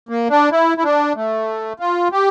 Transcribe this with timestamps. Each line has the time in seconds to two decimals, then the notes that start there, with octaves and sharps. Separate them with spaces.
0.09 A#3
0.30 D4
0.52 E4
0.78 E4
0.84 D4
1.15 A3
1.80 F4
2.12 G4